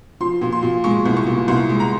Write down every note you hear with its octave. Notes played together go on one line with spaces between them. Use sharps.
F3 C6
A#2
C6
A#2
G#3 C#6
C2
C#6
A#2
C2 C6
G#3
A#5